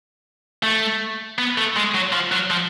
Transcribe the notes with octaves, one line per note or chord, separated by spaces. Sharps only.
A3
B3
A3
G#3
F#3
F3
F#3
F3